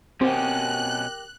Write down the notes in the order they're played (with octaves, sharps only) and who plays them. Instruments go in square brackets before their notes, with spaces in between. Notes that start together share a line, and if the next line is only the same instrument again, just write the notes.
[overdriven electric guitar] B2 C#4 [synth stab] C4 [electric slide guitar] G4 A#4 G5 [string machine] F#6